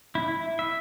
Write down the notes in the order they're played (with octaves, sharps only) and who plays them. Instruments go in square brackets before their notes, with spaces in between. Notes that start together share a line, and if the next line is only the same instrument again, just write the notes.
[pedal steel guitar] E4
E5